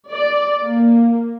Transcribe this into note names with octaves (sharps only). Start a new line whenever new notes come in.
D5
A#3